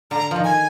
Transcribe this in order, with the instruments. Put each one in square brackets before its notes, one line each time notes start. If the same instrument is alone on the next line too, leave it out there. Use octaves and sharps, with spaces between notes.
[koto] D3 [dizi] A#5
[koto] D#3 F3
[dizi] G#5